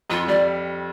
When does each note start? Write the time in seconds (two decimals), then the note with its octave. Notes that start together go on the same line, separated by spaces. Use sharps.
0.10 F2 F4
0.28 G3 D5